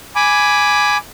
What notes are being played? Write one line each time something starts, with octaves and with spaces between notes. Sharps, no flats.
G#5 B5 D6